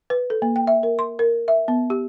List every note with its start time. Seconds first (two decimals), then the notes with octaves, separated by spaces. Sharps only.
0.10 B4
0.30 A4
0.42 A#3
0.56 G5
0.67 E5
0.83 A#4
0.99 C6
1.19 A#4
1.48 E5
1.68 B3
1.90 G4